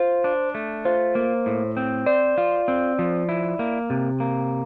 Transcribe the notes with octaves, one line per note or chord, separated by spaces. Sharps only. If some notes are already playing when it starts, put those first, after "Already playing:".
Already playing: F4 C5
D4
A3
F4 C5
A#3
A2
C4
C5 D5
F4
C4
F3
E4
A#3
C3
A#3